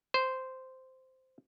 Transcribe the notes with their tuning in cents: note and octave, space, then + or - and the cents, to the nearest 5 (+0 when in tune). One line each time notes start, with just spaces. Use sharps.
C5 -10